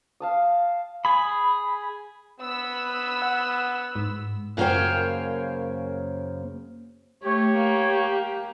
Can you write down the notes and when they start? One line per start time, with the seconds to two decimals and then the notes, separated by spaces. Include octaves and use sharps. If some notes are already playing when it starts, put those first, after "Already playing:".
0.20 F5 A5 D#6
1.05 G#4 B5
2.40 B3 B5 E6
3.22 F#5
3.96 G#2
4.57 F#2 C#3 A#3 C5 C#5 G5
7.23 A3 G4 C#5
7.58 A#3